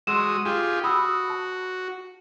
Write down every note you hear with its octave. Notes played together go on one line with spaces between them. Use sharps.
G#3 F#4 C6 D#6 E6 E7
F4 G4 G#4
F#4 B5 D#6 E6
A5